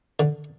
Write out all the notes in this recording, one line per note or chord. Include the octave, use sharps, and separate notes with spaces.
D3